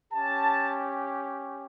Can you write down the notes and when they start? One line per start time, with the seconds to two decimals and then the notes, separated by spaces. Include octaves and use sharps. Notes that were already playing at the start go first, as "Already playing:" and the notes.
0.12 C#4 G4 A5